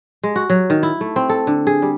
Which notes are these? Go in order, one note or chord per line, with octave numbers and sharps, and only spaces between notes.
G#3
F#4
F#3
D#3
E4
A3
C4
A4
D3
G#4
G3